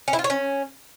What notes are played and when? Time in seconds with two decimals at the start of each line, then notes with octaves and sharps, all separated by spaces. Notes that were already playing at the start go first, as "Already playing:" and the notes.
0.08 C#4
0.13 E4
0.19 F4
0.24 C#5
0.30 C#4